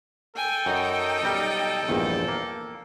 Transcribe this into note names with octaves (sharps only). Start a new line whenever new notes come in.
A4 G5 G#5
F#2 D#4
B1 G3
A#1 E2 G2
A#3